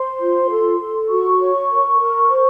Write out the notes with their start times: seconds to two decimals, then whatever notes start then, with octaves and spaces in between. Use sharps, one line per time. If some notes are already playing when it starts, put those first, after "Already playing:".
Already playing: C5 C6
0.20 F4
0.50 A4
0.80 A4
1.09 F#4 C#6
1.39 C#5
1.69 A#4
1.99 A#4
2.29 C5